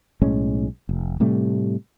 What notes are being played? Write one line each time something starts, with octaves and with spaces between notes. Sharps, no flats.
B1 A2 G#3 C#4
F1
A2 C3 G3 A3